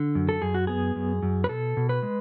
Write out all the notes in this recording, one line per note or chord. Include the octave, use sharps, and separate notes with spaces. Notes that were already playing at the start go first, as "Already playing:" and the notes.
Already playing: D3
F#2
A4
F#2 G#4
F#4
B3 G#4
F#2
F#2
B4
B2 A4
B2
B4
G#3